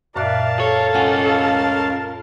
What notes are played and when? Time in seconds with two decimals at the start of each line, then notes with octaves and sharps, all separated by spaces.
0.16 F#2 A#2 A#4 D5 E5 F5 A5 F#6
0.60 A4 C#5
0.95 C#4 F4 F#5 G#5